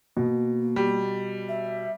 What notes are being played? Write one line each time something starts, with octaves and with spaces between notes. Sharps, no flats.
B2 A#3
G3
E5